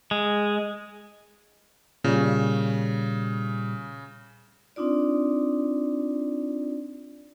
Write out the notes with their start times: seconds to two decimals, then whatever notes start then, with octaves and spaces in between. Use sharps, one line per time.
0.11 G#3
2.04 A#2 C#3 G3
4.76 C4 D4 D#4 F4 D5